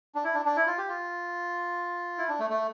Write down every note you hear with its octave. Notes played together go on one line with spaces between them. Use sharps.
D4
E4
D4
D4
E4
F4
G4
F4
E4
D4
A3
A3